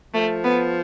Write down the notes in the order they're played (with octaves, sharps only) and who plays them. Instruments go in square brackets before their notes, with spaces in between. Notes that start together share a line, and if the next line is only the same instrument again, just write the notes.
[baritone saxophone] F3 [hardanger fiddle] A3
[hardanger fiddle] B3